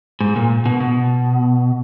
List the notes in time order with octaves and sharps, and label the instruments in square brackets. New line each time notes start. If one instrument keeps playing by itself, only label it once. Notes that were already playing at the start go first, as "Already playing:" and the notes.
[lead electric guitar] G#2
A#2
B2
B2